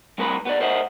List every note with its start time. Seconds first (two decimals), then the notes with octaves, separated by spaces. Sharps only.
0.18 G3 C4 A#4 B4 A5 B5
0.45 B3 B4 D5
0.60 A#4 C5 D#5 E5 F#5